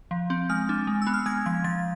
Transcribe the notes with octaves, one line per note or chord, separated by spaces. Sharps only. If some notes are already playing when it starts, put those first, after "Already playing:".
F3
C4
G#3 F6
D4
G#3
B3 E6
F6
G#3 G#6
F3 G#6
F3 A6